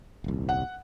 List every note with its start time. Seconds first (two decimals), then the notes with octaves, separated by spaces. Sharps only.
0.24 D#1 C2
0.49 F#5